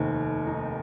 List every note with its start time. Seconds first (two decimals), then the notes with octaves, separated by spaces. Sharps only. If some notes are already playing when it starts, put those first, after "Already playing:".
Already playing: F1 D#2 D#3 C4
0.47 D#4